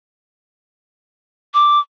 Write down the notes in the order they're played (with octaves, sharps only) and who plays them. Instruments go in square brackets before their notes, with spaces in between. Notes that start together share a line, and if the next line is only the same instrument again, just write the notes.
[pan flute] D6